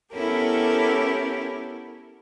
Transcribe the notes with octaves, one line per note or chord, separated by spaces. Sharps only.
B3 C#4 E4 G4 A4 A#4